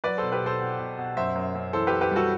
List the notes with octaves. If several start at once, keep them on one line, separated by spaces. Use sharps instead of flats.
F#3 B4 D5
B2 A4 C5
G4 B4
B2 A4 C5
B2
B2
B2
F#2 C5 E5
F#2
F#2
E3 A4 C5
F#2 G4 B4
G4 B4
G3 F#4 A4